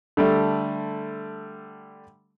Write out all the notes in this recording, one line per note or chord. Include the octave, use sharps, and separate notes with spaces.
D3 G3 A3